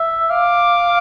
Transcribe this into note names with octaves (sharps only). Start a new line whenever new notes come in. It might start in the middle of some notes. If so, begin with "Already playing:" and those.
Already playing: E5
F5 D6